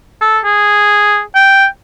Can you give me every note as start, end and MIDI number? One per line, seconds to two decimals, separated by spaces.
0.21 0.39 69
0.44 1.20 68
1.35 1.66 79